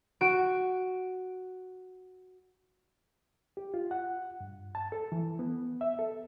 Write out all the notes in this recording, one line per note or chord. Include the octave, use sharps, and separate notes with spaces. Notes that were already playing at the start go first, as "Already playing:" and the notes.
F#4 D7
G4
F4
F#5
G2
A5
A4
E3
B3
E5
A4